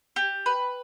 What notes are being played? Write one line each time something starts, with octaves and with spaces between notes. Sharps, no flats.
G4
B4